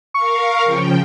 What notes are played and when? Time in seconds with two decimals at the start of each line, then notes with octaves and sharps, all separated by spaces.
0.14 A#4 F5 C#6
0.63 C#3 F3 G5